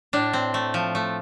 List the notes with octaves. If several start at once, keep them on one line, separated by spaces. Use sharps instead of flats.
A2 D4
C4
A3
F3
A3